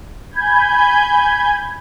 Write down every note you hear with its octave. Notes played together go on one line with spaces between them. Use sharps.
G#5 B5 G6 G#6